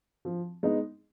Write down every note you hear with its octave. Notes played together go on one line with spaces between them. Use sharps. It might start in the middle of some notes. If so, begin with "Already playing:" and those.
F3
G#3 B3 D#4